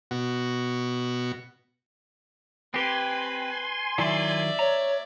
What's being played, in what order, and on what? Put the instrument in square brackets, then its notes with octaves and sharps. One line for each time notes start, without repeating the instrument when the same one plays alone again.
[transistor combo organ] B2 F#4
[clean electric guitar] C4 G4 [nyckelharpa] B4 [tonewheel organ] G#5 C6
[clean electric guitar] D#3 F#3 E4 [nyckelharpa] D5 E5
[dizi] C#5 [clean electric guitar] A#5